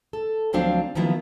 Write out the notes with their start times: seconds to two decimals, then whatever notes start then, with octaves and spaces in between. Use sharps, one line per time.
0.13 A4
0.53 D2 F3 F#3 C4 D4 F5
0.95 D#3 F3 F#3 A#3 B3 E4